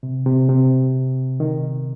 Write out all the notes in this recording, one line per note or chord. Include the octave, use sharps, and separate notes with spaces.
C3
C3
C3
D#3